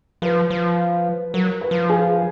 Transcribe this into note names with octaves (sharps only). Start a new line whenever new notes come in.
F3 B4
F3
F#3 A#4
B4
F3
G#4